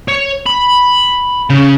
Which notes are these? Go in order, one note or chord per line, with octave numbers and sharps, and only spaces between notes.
C#5
B5
C#3